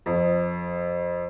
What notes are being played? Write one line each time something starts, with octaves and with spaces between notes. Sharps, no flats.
F2